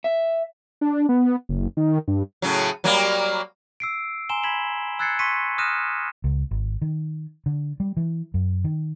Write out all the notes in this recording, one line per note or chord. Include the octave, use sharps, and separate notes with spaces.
E5
D4
B3
F#1
D#3
G2
A2 C#3 F#3
F#3 G3 A#3
E6 C7 D7
G#5 A#5 C6 E7 G7
B5 G#6 B6 E7 F#7
E6 F#6 G#6 A6 C7 C#7
C6 C#6 B6 C#7 D#7
D#6 F6 F#6 A#6 D#7 E7
C#2
G#1
D#3
D3
G3
E3
F#2
D#3